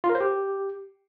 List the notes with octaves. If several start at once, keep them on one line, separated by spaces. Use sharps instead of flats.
F4
A#4
C5
G4